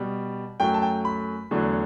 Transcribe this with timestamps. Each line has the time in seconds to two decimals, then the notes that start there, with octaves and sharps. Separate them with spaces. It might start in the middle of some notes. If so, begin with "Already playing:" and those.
Already playing: B2 G3
0.60 F#2 F#3 A3 G5
0.74 A5
0.82 G5
1.05 B5
1.51 E2 D3 F#3 A3